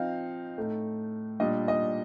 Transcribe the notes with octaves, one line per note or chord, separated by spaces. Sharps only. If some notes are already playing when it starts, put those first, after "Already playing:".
Already playing: F3 C4 D#4 F5
A2 A3 D#4
A#2 G3 D4 D#5
D#5